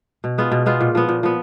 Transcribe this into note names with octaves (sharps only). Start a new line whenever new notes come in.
B2
G#3 B3 F4
B2
G#3 B3 F4
A#2
F3 B3
A#2
F3 B3